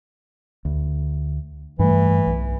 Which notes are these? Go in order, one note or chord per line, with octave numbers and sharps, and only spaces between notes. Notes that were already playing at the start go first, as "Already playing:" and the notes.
D2
G2 E3 A3
B1